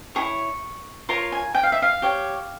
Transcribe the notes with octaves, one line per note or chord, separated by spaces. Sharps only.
E4 G#4 C#5 C#6
F4 A#4 C#5 C6
G#5
G5
F5
E5
F5
G4 C#5